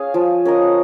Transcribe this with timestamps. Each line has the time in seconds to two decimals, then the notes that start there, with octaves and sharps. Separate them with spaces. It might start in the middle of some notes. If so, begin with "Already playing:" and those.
Already playing: C#4 G#4 F5
0.14 F3
0.45 C#4 A#4 D#5